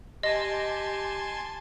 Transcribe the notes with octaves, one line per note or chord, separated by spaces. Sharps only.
G4 D#5 G#5 A5 C6